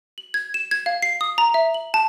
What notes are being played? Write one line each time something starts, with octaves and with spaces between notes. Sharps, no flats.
F#7
G#6
E7
G#6
F5
C7
D#6
A#5
E5
F#7
A5